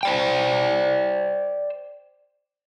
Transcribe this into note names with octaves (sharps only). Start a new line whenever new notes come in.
C5 D5 G5